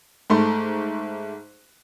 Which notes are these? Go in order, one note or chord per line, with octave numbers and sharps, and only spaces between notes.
G#2 A3 C6